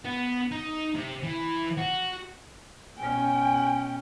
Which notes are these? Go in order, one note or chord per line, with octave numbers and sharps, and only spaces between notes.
B3
D#4
C3
E3
F#4
B2 C#4 G5 G#5